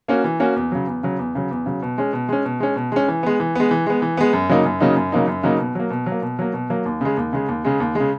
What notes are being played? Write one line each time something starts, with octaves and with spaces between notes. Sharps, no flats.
A#3 C#4 F#4
E3
A#3 C#4 F#4
E2
C#3 F#3
E2
C#3 F#3
E2
C#3 F#3
E2
C#3 F#3
B2
G#3 C#4
B2
G#3 C#4
B2
G#3 C#4
B2
G#3 C#4
E3
G#3 B3
E3
G#3 B3
E3
G#3 B3
E3
G#3 B3
F#2
C#3 F#3 A#3 D#4
F#2
C#3 F#3 A#3 D#4
F#2
C#3 F#3 A#3 D#4
F#2
C#3 F#3 A#3 D#4
B2
F#3 A#3
B2
F#3
A#3
B2
F#3 A#3
B2
F#3 A#3
D#2
C#3 G#3
D#2
C#3 G#3
D#2
C#3 G#3
D#2
G#3
C#3